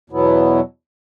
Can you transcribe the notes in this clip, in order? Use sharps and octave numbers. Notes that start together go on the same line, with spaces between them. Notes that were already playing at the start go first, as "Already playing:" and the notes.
E2 B2 F#3 B3 E4